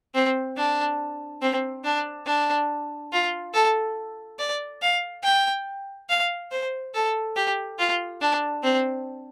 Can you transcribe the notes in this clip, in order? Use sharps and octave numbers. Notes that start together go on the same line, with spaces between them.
C4
D4
C4
D4
D4
F4
A4
D5
F5
G5
F5
C5
A4
G4
F4
D4
C4